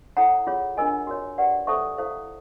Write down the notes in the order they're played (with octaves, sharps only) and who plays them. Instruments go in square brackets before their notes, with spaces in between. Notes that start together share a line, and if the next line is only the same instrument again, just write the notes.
[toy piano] E4 A4 C#5 F#5 A#5
F4 G#4 C#5
D4 F4 A#4 D#5 G#5
F#4 A#4 C#5
G4 B4 D5 F#5
A4 C5 E5 A5 C#6
E4 A4 C5 F5